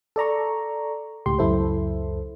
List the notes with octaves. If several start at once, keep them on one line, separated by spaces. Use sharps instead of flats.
A4 D5 A#5 C#6
C#2 A2 G4 C6
C#2 F#2 E4 A4 C5